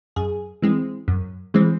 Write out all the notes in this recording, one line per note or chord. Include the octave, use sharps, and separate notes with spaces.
F#2 G#4
E3 G#3 C4
F#2
E3 G#3 C4